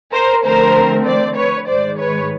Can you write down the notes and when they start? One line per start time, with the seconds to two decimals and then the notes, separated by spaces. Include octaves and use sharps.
0.13 A#4 C5
0.44 D3 F3 A3 C4 A#4 C5
1.05 C5 D5
1.36 B4 C#5
1.67 G#2 D#3 G#3 C5 D5
1.98 B4 C#5